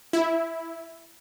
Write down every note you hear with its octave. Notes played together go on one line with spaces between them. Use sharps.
E4